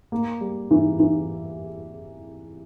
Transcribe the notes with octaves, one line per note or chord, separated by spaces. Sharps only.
A#3
G3
E3
E3